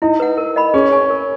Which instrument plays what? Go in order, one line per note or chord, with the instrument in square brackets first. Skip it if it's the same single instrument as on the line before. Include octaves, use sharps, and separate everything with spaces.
[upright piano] D#4 [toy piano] E4
[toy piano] B4 F#5
A#4
D#5 F#5 B5
[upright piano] C#4 [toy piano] G#4
[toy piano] C#5 G#5 C#6
A#4